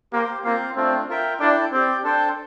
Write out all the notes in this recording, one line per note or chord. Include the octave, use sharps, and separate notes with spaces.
A#3 G4 C5 G5
A#3 C4 F4 C5 F5
A3 C4 D4 F4
F4 A#4 E5 G5
D4 E4 A4 D5 G5
C4 G4 D5 G5
D4 A4 C5 G5